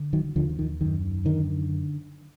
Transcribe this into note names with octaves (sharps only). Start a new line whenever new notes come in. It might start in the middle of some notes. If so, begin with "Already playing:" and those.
Already playing: D3
D#3 F#3
D#2 D3 F3
D#3
F#2 D#3
D3 D#3